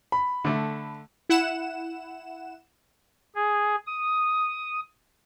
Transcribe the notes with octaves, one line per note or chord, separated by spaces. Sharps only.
B5
D3 A3
E4 F#5 E7
G#4
D#6